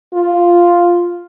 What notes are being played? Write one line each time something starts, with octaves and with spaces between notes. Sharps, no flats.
F4